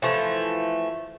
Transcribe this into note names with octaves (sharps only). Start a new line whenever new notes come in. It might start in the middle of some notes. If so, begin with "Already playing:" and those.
E3 F3 A3